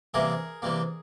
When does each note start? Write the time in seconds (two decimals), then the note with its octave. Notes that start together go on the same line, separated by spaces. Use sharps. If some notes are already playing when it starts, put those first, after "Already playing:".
0.14 C3 E3 G3 A#3 G#4 A#4
0.62 C3 E3 G3 A#3